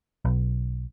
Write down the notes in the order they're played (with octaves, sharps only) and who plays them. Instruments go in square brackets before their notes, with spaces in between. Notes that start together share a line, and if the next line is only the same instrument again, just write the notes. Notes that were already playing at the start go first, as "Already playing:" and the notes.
[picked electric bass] B1